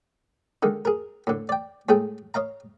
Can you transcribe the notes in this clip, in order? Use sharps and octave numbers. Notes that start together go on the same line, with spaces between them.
D3 D#3 G#3
G#4 A#4
A2 D3
D5 G5
A2 G#3 A3 G#4 G5
C#5 D#5 F5 A#5